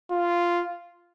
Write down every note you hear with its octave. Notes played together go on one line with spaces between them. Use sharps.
F4